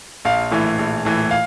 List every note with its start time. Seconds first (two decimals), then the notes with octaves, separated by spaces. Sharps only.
0.25 A#1 F5
0.51 A2 E3
0.79 A#1
1.05 A2 E3
1.31 F5